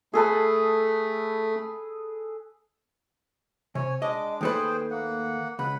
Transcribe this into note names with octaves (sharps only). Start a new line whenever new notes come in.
A3 G#4 A4 B4
C3 C#5 G#5
G#3 D4 D#5 D6
D#2 A3 G#4 B4 C5 G5
A#3 F#5
C#2 B4 F#5 B5